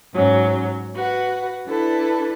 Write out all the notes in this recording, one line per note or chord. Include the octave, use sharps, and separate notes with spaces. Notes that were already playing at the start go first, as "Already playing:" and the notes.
G#2 F#3 C#4
F#4 B4 F#5
D4 E4 A4 B4